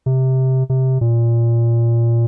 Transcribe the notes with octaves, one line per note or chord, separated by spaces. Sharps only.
C3
C3
A#2